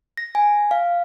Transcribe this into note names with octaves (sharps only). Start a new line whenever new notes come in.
A#6
G#5
F5